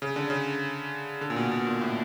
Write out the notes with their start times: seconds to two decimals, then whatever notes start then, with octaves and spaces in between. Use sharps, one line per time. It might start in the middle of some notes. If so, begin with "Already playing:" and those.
0.02 C#3
0.16 D3
0.30 C#3
1.21 D3
1.30 A#2
1.36 B2
1.51 B2
1.66 A#2
1.81 A2